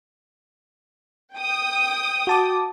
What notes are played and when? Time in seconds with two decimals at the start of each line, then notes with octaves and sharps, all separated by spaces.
1.34 G5 D#6
2.27 F#4 A5 D6